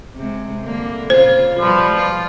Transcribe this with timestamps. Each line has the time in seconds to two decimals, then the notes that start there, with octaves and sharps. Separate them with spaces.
0.15 C3 G#3
0.64 G2 D3 A#3
1.10 A#2 C#3 F4 C5
1.60 B2 F3 G3 B4
1.97 F4